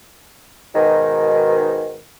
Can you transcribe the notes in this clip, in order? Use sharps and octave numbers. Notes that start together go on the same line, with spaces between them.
G#2 B2 D#3